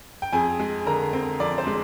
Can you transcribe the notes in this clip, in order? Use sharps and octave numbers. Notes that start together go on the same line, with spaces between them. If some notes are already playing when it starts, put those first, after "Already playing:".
G5
F2 G#4 G#5
G#3
D3 A#4 A#5
C4
F2 D5
C5
G#3